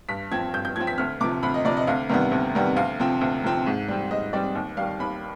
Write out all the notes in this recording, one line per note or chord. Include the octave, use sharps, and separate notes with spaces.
G2 B6
F3 C4 G#6
G2 G6
G6
F3 C4 G#6
B6
D2 F6
C3 F3 D6
D2 B5
D#5
C3 F3 D5
D#5
D2 F5
C3 D#3 G3 B3
D2
C3 D#3 G3 B3
D2 F5
C3 F3 C4
D2
C3 F3 C4
G#2
G3 C4
G#2 D#5
G3 C4 D5
D#2
D#3 G3 F5
D#2 B5